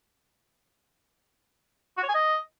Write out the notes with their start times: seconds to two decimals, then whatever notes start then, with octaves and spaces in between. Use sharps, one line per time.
1.98 F#4
2.03 C#5
2.09 G#5
2.15 D#5